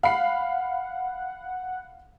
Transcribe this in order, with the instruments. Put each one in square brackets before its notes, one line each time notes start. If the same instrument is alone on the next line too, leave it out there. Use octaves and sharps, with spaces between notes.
[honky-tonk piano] F5 B5 C7 [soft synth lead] F#5